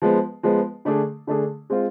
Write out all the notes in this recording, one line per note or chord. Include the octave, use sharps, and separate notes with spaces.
F3 G#3 B3
F3 G#3 B3
D3 A3 D4 G#4
D3 A3 D4 G#4
G#3 C4 F4